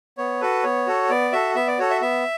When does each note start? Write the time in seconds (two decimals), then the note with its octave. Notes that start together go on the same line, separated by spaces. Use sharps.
0.18 B3 C#5
0.41 F#4 A4 B4
0.63 B3 C#5
0.87 F#4 A4
1.10 B3 D5
1.32 F#4 A4 E5
1.55 B3 E5
1.67 D5
1.79 F#4 A4 C#5
1.90 E5
2.01 B3 E5